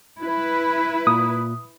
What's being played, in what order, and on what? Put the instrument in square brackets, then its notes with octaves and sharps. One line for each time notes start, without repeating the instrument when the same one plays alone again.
[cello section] E4 B4
[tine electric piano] A#2 [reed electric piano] D#6